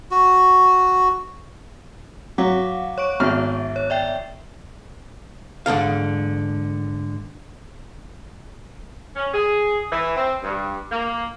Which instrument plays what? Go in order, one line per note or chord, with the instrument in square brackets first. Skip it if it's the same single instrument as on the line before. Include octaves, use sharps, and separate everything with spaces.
[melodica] F#4
[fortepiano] F#3 [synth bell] F5 F#5 D6
[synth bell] C#5 C#6 D7
[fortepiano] G#1 F6 [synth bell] B3 E5
[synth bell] C#5
D5 E5 G5
[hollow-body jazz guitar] G#2 D3 A4 F5
[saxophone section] C#4
G#4
E3
C4
G2
A#3